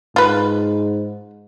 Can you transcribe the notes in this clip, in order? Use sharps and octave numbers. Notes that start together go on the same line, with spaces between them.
G#2 F4 B4